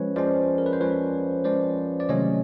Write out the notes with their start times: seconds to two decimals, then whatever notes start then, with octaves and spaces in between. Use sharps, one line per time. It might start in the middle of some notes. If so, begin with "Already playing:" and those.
Already playing: F3 G#3 C#4 B4 C#5
0.16 F3 G#3 C#4 C5 D5
0.58 A#4
0.66 B4
0.73 C5
0.80 F3 G#3 C#4 B4 C#5
1.44 F3 G#3 C#4 C5 D5
2.00 D5
2.09 C3 D#3 F#3 A3 C#4 C#5 D#5